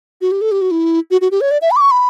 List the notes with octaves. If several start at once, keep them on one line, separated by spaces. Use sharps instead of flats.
F#4
G4
A4
G4
F#4
E4
F#4
F#4
G4
C#5
D5
E5
B5
D6
C#6
B5